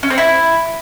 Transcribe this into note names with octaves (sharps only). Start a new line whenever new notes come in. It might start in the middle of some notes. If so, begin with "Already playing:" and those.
C#4
C4
E4